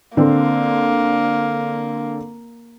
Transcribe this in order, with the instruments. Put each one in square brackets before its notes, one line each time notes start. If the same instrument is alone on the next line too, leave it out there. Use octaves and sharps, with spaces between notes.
[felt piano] D3 C4 [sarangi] A#3